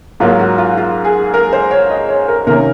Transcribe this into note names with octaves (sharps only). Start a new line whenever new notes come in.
G#2 F#3 A#3 F4
F#4
F4
F4
G#4
A#4
C5
C#5
D#5
C#5
A#4
C3 D#3 A#3 C#4 A#4